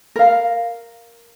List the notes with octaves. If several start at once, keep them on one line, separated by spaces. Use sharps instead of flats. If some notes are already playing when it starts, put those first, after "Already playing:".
A#4 F5